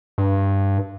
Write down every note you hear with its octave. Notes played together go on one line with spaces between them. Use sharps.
G2